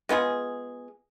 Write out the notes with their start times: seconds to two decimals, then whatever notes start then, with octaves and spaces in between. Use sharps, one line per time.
0.09 G#3 B3 F4 G#4